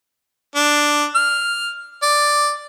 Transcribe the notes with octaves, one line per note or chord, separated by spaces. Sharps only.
D4
F6
D5